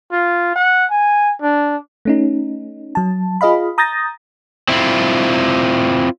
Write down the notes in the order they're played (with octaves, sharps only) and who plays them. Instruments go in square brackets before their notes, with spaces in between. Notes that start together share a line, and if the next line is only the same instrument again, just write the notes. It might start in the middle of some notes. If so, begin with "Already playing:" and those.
[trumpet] F4
F#5
G#5
D4
[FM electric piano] A3 C#4 D#4
F#3 A5
F4 G#4 D#5 F5 B5
A#5 D#6 G6 A6 A#6
[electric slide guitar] C4 E4 F4